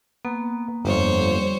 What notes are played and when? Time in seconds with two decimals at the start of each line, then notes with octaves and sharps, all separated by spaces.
0.25 A#3 B3
0.85 G1 F2 G3 C5 C#5